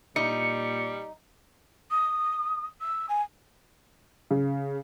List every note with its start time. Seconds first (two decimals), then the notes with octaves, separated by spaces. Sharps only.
0.16 A#2 G3 D#4 C#7
1.91 D#6
2.81 E6
3.09 G#5
4.31 C#3